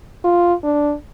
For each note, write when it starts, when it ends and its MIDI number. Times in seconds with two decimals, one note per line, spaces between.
0.24 0.54 65
0.63 0.94 62